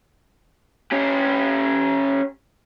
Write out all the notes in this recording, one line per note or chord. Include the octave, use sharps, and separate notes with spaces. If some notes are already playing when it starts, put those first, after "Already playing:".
C#4 G4